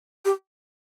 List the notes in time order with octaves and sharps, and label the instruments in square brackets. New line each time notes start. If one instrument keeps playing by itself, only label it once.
[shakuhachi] G4